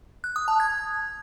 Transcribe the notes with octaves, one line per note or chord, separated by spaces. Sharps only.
F#6
D#6
A5
G#6